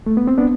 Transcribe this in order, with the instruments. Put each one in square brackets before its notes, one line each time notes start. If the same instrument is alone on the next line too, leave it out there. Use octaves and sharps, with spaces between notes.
[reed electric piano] A3
B3
C4
B3 D4